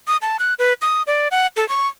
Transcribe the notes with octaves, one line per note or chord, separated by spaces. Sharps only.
D#6
A5
F#6
B4
D#6
D5
F#5
A4
C#6